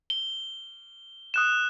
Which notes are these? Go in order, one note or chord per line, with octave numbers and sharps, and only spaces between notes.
G7
D#6 F#6 E7